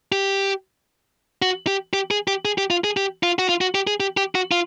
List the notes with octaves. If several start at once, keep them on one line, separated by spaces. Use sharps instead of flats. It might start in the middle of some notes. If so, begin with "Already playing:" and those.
G4
F#4
G4
G4
G#4
G4
G#4
G4
F4
G#4
G4
F4
F#4
F4
F#4
G4
G#4
G4
G4
F#4
F4